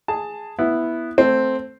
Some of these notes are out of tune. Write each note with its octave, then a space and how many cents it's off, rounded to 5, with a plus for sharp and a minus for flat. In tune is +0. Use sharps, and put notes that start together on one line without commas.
G#4 +0 A5 +15
B3 +0 E4 +0
A3 +0 C4 +0